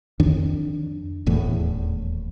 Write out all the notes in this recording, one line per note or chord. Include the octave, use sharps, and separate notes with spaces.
F2 D#3 D4
D#1 E2 A2